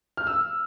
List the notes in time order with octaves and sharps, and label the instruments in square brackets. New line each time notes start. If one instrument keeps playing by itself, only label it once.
[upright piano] F6
E6